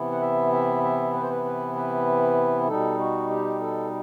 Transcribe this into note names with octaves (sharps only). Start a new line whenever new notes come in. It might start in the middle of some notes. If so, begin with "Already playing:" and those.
Already playing: C3 E3 B3 E4
F#5
E5
E5
E5
B4
C5
B4
B4
B4
B2 G3 D#4 A4
F#4
G4
A4